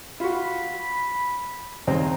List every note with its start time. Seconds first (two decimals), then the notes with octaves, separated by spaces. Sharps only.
0.20 F4 F#4 B5
1.87 D#2 C#3 C4 A#5